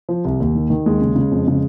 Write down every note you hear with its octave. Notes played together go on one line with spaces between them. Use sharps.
F3
C2
D#2
D#3
D#3
D#2 G#3
C#3
C#3
F2
C#3